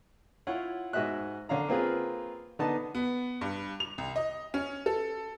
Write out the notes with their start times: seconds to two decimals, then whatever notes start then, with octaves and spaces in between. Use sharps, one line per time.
0.47 E4 F4 C#5 F#5
0.93 G#2 F#4 D#5 E5 F#6
1.49 D3 C#4 F5 A#5
1.69 A#3 C4 F4 G#4 B4
2.59 D3 B3 D#4 D#5 A5
2.95 B3
3.41 G2
3.80 F7
3.98 C2
4.16 D#5
4.54 C#4
4.86 A4